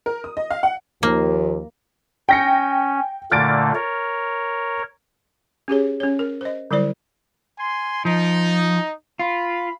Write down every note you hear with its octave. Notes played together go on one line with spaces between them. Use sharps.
A#4
D#6
D#5
F5
F#5
D#2 F3 A#3
C#4 G5 A#6 C#7
A#2 D3 A3 F6 A6 D7
A#4 C#5
C#4 G4 G#4 C#5
C#4 C#5
A#4
C5 D#5
D3 F#3 G3 E4 C5 D5
G#5 C6
F3 D#4
F4 B5